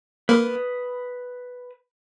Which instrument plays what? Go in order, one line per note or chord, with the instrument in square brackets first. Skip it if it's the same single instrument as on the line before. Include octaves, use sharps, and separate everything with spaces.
[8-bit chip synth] A#3 [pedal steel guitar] B4 B5 D#6